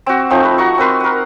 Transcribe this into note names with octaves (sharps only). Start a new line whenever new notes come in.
C4 F#4
F3 A3 C4 D#4
B4
F#4 A#5 C#6
C4 A#4 B4 C6
A#4 F#5